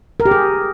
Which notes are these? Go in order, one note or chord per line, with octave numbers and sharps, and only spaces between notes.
A#4
G4
G#4